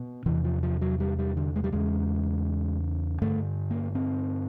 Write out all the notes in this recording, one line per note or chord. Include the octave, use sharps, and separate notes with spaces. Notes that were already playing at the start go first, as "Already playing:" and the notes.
Already playing: B2
E2 C3 E3
F3
F3
F#3
G3
G3
D3
G#3
G3
E2 C#3 G#3
G2 D3 A3
A#3
C4